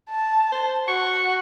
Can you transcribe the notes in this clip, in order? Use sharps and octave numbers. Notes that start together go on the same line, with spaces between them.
A5
C5
F#4 C#6